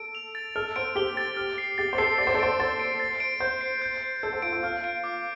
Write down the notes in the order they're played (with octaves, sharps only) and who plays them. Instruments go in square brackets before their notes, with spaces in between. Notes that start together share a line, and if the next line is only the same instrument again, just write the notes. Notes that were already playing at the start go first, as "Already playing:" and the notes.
Already playing: [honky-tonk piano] A4 [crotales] D7
[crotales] F7
A6
[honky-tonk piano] A4 [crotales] F6
[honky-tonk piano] C5 [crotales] D7
[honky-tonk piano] G4 [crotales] G7
[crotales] A6
F6
C7
[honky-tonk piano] G4 [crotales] A6
[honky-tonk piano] C5
[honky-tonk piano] A4 [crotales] C7
[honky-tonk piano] D5 [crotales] A6
[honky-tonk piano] C5
A4
[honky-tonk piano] C5 [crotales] D7
[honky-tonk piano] C5 [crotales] A6
[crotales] D7
A6
D7
[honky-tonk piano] C5 [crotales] G6
[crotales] C7
G6
C7
[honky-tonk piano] A4 [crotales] G6
[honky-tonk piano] C5
[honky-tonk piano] F4 [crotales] D7
[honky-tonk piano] F4
[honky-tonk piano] F4 [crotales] F6
[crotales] D7
D6